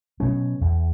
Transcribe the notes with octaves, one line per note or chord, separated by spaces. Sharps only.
B2 F#3 C#4
E2